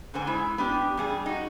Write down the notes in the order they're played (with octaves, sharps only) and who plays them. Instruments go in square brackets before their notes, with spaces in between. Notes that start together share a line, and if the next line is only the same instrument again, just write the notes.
[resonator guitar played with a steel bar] G#2 D3 C5 G#5
G#3 E4
B3 D4 G4
G2 G3 G#4
D#4 F#4